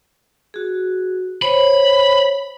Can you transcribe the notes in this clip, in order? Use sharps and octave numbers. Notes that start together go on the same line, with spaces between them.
F#4 G#4
C5 C#5 B5